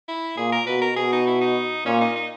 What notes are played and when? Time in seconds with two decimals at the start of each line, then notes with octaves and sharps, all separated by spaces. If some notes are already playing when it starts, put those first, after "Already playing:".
0.08 E4
0.37 A#2 G#4
0.52 A#4
0.67 B2 B4
0.82 A#4
0.97 B2 G#4
1.12 D#4
1.27 E4
1.41 D#4
1.86 A#2 C#4
2.01 D#4
2.16 D#4